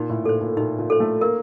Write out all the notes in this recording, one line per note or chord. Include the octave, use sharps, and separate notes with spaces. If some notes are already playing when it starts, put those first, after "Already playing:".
Already playing: A#2 D#4
A2
A#2 A4 C5
A#2
A#2 D#4
A#2
A4 C5
A3
A#3 A#4